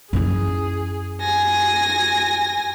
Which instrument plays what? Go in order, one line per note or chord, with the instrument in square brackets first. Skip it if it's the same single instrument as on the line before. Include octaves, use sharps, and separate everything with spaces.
[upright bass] F#2 E4 [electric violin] G#4
[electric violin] G#5 A#6